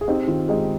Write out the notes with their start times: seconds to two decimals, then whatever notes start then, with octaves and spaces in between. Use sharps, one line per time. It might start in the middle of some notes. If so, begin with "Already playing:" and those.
0.01 G#4
0.08 C4 D#4 G4
0.28 D#3 F4
0.49 G#3 D#4 G4